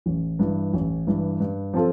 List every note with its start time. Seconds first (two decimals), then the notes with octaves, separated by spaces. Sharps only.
0.06 A1
0.39 G2 E3
0.73 A1
1.07 G2 E3
1.40 G2
1.74 F3 C4 F4 A4